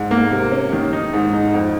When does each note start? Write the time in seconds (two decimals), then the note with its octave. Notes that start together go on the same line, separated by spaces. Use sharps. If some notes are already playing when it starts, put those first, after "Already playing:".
Already playing: G#2
0.11 A#3
0.31 C3
0.52 C#4
0.72 D#3
0.93 D#4
1.13 G#2
1.33 D#4
1.54 F2